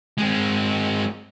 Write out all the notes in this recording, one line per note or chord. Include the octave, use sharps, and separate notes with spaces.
G#3 C4